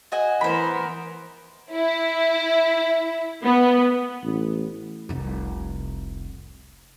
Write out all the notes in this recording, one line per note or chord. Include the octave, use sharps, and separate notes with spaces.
F#4 D#5 G#5
E3 B3 A#4 C5 B5
E4
B3
A1
F1 C2